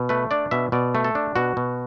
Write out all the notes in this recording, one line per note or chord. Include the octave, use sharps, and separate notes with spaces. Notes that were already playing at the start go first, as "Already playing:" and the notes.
Already playing: B2
A3 B4
D4 D5
B2 E5
B2 D5
A3
A4
D4
B2 F#4
B2